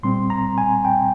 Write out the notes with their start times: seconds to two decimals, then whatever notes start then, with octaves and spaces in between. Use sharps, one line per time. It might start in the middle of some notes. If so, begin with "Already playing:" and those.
0.03 A#2 G3 C4 C6
0.30 A#5
0.58 G#5
0.85 G5